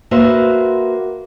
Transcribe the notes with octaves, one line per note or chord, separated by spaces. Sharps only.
A#3 F#4 B4 C5 E5